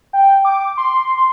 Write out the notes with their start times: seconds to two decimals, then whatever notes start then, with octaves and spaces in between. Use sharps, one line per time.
0.13 G5
0.45 D6
0.78 C6